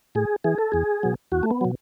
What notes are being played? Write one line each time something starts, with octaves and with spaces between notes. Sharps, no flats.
A2 G#4
E3 G#4
A4
E2 G#4
B2 F#3
E2 F#4
A3
B3
B2 F#3